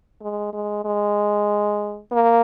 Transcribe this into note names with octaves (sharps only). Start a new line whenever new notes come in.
G#3
G#3
G#3
A#3